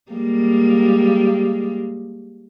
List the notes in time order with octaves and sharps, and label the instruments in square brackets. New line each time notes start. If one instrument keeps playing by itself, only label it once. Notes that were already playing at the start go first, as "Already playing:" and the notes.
[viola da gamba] G3 G#3 A#3